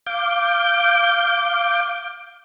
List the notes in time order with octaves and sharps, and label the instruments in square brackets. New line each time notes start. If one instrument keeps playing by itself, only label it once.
[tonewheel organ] F5 D6 G6